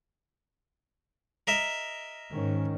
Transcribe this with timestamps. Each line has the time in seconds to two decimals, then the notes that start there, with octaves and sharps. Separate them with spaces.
1.47 A#4 D#5 E5
2.31 G#2 D#3 C#4